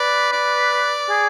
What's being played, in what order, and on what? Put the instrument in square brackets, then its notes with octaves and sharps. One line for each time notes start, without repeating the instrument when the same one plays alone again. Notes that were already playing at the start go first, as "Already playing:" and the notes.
Already playing: [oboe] B4 [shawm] D5
[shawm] D5
[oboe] G#4